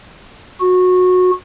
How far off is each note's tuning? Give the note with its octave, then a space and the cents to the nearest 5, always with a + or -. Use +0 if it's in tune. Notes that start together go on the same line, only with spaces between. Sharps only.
F#4 -20